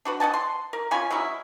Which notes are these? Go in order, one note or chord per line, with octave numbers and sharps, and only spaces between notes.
D4 F#4 B4
D#5 F#5 G#5 A5
C6
A#4
C#4 F4 G#5 B5
F#3 G#3 C#4 E4